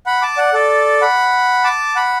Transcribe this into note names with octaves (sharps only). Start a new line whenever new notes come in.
F#5 B5
A5 D6
D5 F#5
A4 D5
F#5 B5
A5 D6
F#5 B5